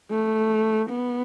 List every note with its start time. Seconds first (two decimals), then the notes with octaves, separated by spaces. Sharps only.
0.10 A3
0.89 B3